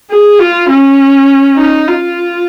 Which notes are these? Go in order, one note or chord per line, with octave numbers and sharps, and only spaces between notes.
G#4
F4
C#4
D#4
F4